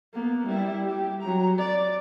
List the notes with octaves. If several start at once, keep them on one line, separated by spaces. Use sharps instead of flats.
A#3 B3
G3 E4
G4
F#3 A#5
D5